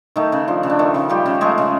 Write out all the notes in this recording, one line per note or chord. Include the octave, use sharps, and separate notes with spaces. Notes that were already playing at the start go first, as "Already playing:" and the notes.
D#3 A3 D#4
C#3
F3 D4
C#3
D4
D#3 A3 D#4
C#3
F3 G3 G4
C#3
G#3 A3 G#4
C#3